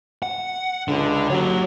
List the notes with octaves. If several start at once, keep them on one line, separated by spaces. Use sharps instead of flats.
F#5
C#2 D3
F#3 G4 C#5